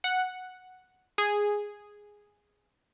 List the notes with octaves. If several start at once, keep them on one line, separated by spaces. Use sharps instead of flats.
F#5
G#4